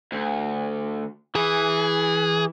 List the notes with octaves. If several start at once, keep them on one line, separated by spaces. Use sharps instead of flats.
D2
E3 G#4